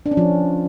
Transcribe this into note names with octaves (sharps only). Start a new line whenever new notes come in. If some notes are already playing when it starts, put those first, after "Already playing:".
D4
C#4
F3